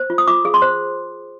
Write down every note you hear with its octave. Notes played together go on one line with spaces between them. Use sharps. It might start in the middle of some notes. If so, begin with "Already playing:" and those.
Already playing: C5
F4
D#6
F4 D6
G#4
C6
C5